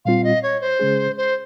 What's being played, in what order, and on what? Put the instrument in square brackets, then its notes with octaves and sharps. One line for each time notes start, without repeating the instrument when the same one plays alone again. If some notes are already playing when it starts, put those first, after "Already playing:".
[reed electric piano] A#2 G3 C4 F4 [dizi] F5
[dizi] D#5
C#5
C5
[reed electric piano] C#3 G#3 C#4 G#4
[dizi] C5